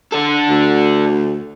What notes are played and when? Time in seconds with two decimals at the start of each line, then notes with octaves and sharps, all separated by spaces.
0.12 D4 A4
0.50 D2